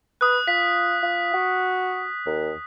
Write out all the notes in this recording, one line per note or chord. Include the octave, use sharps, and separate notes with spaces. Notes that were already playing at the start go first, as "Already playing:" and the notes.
B4 D#6 F#6
F4 B6
F4
F#4
D#2